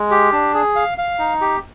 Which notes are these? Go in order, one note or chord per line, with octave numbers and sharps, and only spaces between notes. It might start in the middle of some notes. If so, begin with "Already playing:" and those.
Already playing: G#3
G4
D4
G#4
F5
F5
D#4
G4